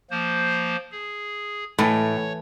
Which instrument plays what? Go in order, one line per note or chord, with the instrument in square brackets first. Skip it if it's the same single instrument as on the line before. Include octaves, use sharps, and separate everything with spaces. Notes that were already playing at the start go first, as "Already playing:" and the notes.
[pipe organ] F3 A#3 C5
G#4
[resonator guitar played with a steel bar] A2 [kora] E3 A3 [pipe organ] C#5